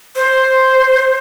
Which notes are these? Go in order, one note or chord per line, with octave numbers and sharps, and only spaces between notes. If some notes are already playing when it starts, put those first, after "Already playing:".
C5